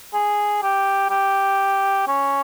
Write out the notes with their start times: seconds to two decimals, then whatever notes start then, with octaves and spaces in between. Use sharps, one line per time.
0.13 G#4
0.62 G4
1.10 G4
2.08 C#4